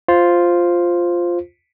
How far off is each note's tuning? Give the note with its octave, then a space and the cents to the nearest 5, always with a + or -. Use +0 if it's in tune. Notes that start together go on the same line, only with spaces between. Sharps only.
F4 +0 C5 +0